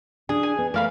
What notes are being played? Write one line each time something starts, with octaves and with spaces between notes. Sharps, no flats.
D4 G#4
G#5
B3
A3 A#4 D5 F5 B5